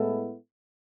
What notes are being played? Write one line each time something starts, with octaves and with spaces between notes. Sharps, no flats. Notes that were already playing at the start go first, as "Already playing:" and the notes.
Already playing: A2 G#3 B3 E4 A4